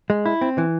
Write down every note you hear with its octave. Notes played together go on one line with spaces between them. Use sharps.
G#3
E4
C4
E3